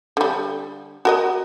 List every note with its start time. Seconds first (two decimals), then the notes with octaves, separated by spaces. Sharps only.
0.17 D3 G3
1.05 F#4 A#4 D#5